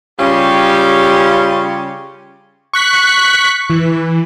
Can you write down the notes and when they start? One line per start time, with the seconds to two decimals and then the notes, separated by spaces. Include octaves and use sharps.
0.19 C#3 G3 C#4 F4 G4
2.74 C#6 F#6 B6
3.70 E3